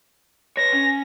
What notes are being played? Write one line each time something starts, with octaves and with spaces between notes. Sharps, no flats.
B4 C#5 A#6
C#4